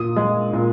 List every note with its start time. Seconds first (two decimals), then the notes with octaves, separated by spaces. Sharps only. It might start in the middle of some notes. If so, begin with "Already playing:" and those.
Already playing: A#2 D#6
0.16 G#3
0.53 A#2